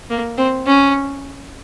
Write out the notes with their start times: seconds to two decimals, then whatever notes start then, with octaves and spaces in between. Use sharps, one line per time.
0.10 A#3
0.38 C4
0.66 C#4